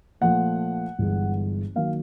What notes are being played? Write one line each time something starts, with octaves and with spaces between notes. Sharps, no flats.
A#2 F3 A3 F#5
G1 G2 E3 G#3
D#3 F#3 A#3 F5